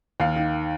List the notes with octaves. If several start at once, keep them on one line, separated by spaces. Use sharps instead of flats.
D#2 F5
D#3